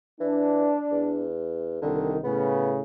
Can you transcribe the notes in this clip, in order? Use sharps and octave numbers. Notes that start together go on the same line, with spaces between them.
E3 D4
E2
C2 D3 D#3
A2 C#3 B3